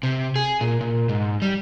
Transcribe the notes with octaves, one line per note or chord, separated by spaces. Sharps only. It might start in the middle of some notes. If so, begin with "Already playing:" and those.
C3
G#4
A#2
A#2
G#2
G3